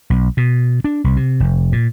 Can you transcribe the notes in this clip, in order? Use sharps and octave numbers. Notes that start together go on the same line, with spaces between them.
B1
B2
D4
C2
C3
F1
A#2